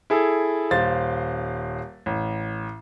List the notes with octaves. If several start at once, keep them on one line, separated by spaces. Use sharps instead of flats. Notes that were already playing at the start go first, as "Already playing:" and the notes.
E4 G#4 A4
D#1 C5 F5 A6
A1